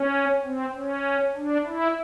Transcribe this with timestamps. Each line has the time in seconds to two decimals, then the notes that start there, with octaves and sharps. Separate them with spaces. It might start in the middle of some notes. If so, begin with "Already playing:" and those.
Already playing: C#4
0.44 C4
0.74 C#4
1.36 D4
1.66 E4